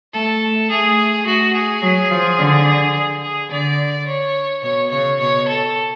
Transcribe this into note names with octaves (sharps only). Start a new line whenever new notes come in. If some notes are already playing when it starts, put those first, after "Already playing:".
A3 A4
A3
A3 G#4
A3 F#4
G#4
F#3
F3
D3
G#4
G#4
D3 D5
C#5
B2 C#5
C#3 C#5
B2 C#5
A4